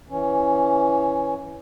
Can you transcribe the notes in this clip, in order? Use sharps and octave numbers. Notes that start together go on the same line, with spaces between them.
E3 C#4